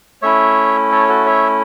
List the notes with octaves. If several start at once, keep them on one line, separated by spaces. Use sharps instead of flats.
A3 C#4 E4 C#5 E5
A4 C#5
F#4 A4
C#5 E5